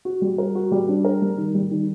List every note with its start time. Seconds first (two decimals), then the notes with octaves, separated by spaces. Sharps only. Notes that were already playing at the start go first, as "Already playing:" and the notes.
0.05 F#4
0.22 G3
0.38 A#4
0.55 F#4
0.72 G3
0.89 D4
1.05 A#4
1.22 G3
1.38 D#3
1.55 G3
1.71 D#3